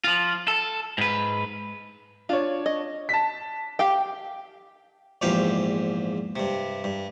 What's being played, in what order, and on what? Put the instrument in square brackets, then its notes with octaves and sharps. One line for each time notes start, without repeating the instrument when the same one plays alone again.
[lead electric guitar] F3 F4
A4
G#2 B4
[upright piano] D4 C#5 [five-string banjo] F4
[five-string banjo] D#5
[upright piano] A5 B6
[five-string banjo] G4 F5 G5 [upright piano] D6
[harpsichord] A#1 E2 G#2 F3 G4 F5
G2 C3
G2